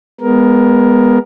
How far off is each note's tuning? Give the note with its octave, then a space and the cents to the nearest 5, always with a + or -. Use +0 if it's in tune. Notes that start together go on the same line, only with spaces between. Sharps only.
G#3 -15 B3 +0 A#4 +10